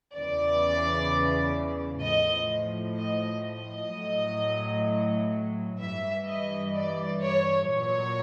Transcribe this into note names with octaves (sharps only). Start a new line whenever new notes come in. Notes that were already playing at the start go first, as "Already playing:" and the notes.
E2 C#3 E3 D5
A2 F3 D#5
D#5
D#5
A2 F#3
G2 E3 E5
D#5
D5
C#5
A#2 F#3 C#5